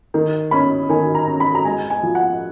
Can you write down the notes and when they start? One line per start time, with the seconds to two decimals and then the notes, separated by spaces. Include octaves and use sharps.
0.14 D#3
0.51 C#4 B5
0.89 D#3 G#5
1.15 A#5
1.27 C#4
1.40 B5
1.55 A#5
1.65 G#3 G#5
1.90 G#5
2.03 F3
2.15 F#5